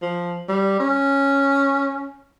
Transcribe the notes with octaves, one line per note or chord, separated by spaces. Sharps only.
F3
G3
C#4